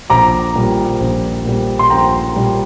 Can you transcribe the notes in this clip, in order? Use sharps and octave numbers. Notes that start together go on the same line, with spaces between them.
A#1 A#5 D6
A#2 G3
A#1
A#2 G3
C6
A#1 G5 A#5
A#2 G3